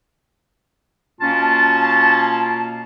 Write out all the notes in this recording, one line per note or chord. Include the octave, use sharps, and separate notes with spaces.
B2 A#3 C#4 F4 A5